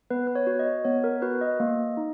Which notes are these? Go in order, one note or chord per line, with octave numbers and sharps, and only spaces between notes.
B3 B4
B4
C#5
F#4
D#5
B3 C#5
A#4
F#4 B4
D#5
A#3
D#4